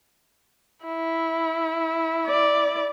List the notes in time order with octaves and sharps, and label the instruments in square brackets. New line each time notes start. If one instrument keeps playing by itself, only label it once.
[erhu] E4
[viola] D5